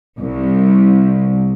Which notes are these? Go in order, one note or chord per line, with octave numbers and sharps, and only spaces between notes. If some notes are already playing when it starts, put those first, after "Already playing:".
C2